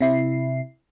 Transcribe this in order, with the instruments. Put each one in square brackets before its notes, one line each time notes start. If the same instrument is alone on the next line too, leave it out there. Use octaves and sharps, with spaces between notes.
[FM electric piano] C3 E4 C7